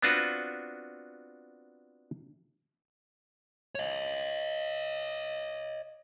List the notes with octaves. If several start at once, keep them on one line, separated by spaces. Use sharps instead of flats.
B3 C4 D4 F4 F#4 B4
C#5 D#5